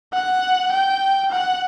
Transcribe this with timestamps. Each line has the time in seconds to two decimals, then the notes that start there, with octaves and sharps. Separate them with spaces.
0.14 F#5
0.72 G5
1.31 F#5